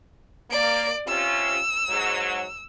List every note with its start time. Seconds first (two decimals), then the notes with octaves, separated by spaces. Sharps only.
0.51 A#3 D5 D7
1.07 C3 C#4 F4 E6
1.89 G#2 F#3